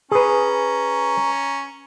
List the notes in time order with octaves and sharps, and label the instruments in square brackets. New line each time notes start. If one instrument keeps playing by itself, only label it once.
[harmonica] C#4 A#5 [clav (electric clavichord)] G#4 B4